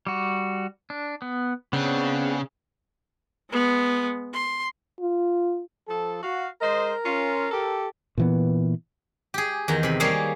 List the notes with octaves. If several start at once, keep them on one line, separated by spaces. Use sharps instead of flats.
G3 F#4
D4
B3
C#3 B3 C4 D4
G#3 B3
C6
F4
F3 A4
F#4 F5
G#3 A#4 C5 D#5
C#4 F4
G4 A4
A#2 E3 B3
G4 G#4
E2 D#3 A#5
C3 B5
G3 A#3 G#4 C#5 F5